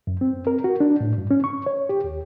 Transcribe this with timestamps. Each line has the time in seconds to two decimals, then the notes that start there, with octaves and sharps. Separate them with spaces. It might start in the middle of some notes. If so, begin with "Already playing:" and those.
0.07 F#2
0.21 C4
0.47 A#4
0.64 F#4
0.80 D4
1.01 A2
1.18 G2
1.31 C#4
1.44 C#6
1.66 C#5
1.89 G4
2.04 D#2